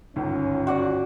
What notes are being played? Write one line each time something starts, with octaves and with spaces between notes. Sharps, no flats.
G1 C#2 G#2 C#4
F#4 D5 F#5